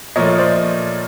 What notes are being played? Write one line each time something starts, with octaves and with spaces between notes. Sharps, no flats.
A#2 F3 A3 C#5 D#5
C5 D5